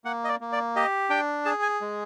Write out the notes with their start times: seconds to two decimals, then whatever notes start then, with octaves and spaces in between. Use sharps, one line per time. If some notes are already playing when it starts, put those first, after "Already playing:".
0.05 A#3 F#5
0.24 D#5
0.29 D5
0.41 A#3
0.52 D5
0.76 G4 D#5
1.10 D4 G5
1.45 G#4 A5
1.62 G#5
1.81 G#3